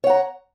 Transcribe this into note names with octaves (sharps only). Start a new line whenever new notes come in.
C#5 F#5 A#5